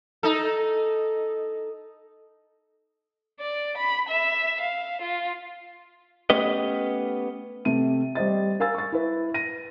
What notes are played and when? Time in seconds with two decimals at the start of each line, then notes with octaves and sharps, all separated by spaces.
0.23 D#4 A4
3.40 D5
3.77 B5
4.09 E5
4.61 F5
5.01 F4
6.30 A3 B3 C#4 G4 B4 D#5
7.65 C3 A3 D#7
8.15 G3 C5 D#5 A6
8.60 A#4 F5 G#5 E6 A6
8.75 C#6 A6
8.92 E4 B4
9.34 A#6 D#7